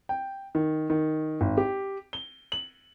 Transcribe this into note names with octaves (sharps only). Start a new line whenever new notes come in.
G5
D#3
D#3
G#1
G4
G7
F#7